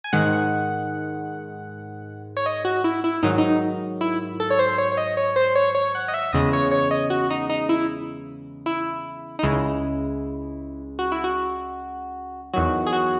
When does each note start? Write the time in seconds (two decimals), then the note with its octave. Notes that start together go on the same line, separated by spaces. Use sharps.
0.04 G#5
0.13 G#2 D#3 G#3 F#5
2.37 C#5
2.46 D#5
2.65 F#4
2.84 E4
3.04 E4
3.23 G#2 D#3 F#3 D#4
3.38 D#4
4.01 E4
4.40 A4
4.50 C#5
4.59 C5
4.78 C#5
4.92 C#5
4.97 D#5
5.17 C#5
5.36 C5
5.55 C#5
5.75 C#5
5.95 F#5
6.08 D#5
6.14 E5
6.33 E2 C#3 G#3 D#5
6.53 C#5
6.71 C#5
6.91 D#5
7.10 F#4
7.30 D#4
7.50 D#4
7.69 E4
8.66 E4
9.39 D#4
9.43 C#2 C#3 G#3 E4
10.99 F#4
11.12 E4
11.24 F#4
12.53 E2 D#3 F#3 F#4
12.87 G#4
12.93 F#4